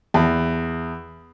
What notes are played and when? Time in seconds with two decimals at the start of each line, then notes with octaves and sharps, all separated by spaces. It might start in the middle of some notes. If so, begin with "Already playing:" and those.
0.14 E2